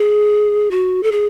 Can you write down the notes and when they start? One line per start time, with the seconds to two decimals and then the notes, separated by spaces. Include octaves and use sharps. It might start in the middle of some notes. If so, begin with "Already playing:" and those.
Already playing: G#4
0.71 F#4
1.03 A4
1.12 G#4